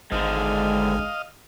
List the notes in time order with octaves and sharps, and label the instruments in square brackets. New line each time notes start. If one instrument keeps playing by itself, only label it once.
[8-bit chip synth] G#1 [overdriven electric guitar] G#2 D3 [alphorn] G#3 [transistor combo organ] D#5 F5